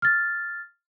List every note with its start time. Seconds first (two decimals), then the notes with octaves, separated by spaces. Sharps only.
0.02 F6 A6